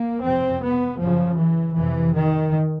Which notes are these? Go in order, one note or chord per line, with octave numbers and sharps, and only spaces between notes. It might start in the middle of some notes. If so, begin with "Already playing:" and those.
Already playing: A#3
F2 C3 C4
B3
F#2 C#3 F3
E3
F2 C3 E3
D#3